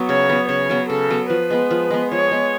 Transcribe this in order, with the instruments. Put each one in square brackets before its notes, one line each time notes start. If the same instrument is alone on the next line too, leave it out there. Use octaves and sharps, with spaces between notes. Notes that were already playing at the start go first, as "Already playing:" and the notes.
Already playing: [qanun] F#3 B3
[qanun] C#3 [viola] C#5
[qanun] F#3 B3
[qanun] C#3 [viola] C#5
[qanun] F#3 B3
[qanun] C#3 [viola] A4
[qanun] F#3 B3
[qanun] F3 [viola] B4
[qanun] G#3 B3
F3
G#3 B3
[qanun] F3 [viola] C#5
[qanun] G#3 B3